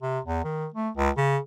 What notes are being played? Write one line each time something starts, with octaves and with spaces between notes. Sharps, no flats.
C3
E2
D#3
A3
C#2
C#3